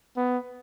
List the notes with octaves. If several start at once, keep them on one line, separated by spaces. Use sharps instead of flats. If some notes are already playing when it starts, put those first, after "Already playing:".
B3